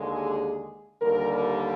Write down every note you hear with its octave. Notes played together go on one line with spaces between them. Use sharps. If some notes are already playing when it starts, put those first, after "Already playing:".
Already playing: D#2 D3 G#3
G#4
D#2 D3 G3 A#4
A#4